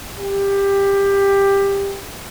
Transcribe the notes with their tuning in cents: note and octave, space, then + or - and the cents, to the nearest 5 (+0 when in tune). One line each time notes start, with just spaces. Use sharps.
G4 +15